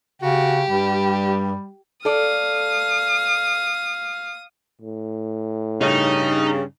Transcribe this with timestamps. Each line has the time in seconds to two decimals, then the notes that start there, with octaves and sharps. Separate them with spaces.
0.22 C#3 F#4 G4
0.69 G2 G3
2.05 A4 D5 F5 D#6
4.82 A2
5.81 G2 C#3 D#4